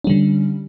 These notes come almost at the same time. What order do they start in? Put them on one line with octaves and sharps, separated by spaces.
C#4 G3 D3